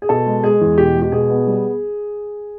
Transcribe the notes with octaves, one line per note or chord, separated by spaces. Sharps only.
G#4
B2 A4
G#3
G#3 G#4
E2
B2 G4
G#3
G4
B2 G#4
B3
G3